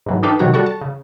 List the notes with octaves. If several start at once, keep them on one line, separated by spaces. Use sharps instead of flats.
G#2 E3 F#3
D4 D#4 A4 B4 F5 G5
C3 D#3 F#3 F#4 A#5
G3 F#4 A4 F#5 C#6
A5
C#3